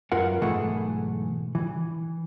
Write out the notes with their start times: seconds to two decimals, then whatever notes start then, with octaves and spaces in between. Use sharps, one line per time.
0.12 F#2 F4 A#4 B4 F#5
0.42 B1 G#2 E3 A3 G#4 F#5
1.55 E3